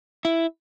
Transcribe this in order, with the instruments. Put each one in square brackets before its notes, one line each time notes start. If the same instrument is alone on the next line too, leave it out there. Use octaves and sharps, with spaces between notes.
[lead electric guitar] E4